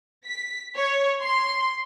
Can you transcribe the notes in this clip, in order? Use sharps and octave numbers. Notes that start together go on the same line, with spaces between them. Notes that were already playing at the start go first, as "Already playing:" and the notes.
B6
C#5
C6